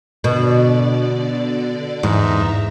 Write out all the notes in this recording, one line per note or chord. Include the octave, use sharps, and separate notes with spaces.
B2 D3 D5
E2 G#2 E5 A#5